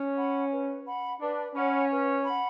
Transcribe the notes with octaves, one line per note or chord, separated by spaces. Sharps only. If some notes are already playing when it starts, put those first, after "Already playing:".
Already playing: C#4
F#5 B5
B4
F#5 B5
D4 B4
C#4 F#5 B5
B4
F#5 B5